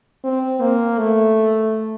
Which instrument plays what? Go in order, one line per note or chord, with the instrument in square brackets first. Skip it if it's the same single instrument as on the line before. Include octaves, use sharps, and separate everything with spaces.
[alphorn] C4
A#3
A3